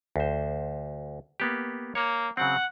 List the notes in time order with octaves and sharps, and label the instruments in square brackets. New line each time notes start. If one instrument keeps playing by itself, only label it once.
[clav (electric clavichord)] D2 C5
A#3 B3 G4
[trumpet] A#3 [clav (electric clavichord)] C#5
[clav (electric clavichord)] C#3 F#3 C4 [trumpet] F#5